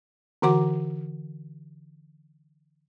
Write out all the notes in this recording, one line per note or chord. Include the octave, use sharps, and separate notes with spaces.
D3 E3 F#4 F#5 A#5 D6